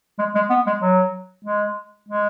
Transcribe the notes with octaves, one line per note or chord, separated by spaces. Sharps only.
G#3
G#3
B3
G#3
F#3
G#3
G#3